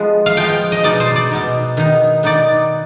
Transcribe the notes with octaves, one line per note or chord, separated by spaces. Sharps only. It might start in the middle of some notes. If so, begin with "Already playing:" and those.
Already playing: F3 G#3 B3
F5
F3 G#3 B3 G5
G5
D#5
B2 B3 D#4 D5
C5
D5
B2 B3 D#4
D#3 B3 D#4
D#3 B3 D#4 D5